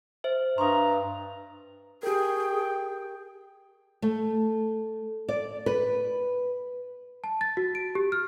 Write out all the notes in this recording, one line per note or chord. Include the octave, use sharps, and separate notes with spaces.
C5 E5
G2 A#5 C6 C#6 D#6
G4 G#4 A#4 G5
A3
D5
B4
A5
A6
F#4
D7
G4
F6